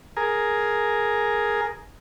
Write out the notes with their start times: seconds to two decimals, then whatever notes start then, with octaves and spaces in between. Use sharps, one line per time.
0.17 G#4 A#4